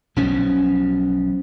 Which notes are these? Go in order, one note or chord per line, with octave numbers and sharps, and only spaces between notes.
B1 B2 F3 C#4